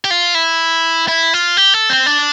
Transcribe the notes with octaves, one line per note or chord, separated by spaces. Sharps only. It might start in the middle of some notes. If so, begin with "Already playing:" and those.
G4
F4
E4
E4
F4
G4
A4
C4
D4